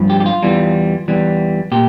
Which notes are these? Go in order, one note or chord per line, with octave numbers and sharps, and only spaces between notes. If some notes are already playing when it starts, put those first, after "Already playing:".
Already playing: G2 F3
G4
G4
F4
E2 E3 G3
E2 E3 G3
A#2 G4